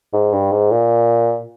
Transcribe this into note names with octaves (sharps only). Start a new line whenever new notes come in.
G#2
G2
G#2
A#2